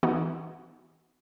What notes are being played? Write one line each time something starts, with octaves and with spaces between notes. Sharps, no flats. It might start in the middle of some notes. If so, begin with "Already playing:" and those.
E3 B3 D#4 F#4